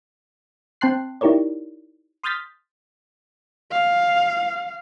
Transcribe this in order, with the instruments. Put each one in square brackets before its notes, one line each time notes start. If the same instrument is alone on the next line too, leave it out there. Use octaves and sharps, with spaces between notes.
[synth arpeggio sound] C4 G5 A5 C6 F#6 C7
D#4 E4 G4 A#4 C#5 D5
C6 D#6 F6 G6 A6 B6
[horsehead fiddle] F5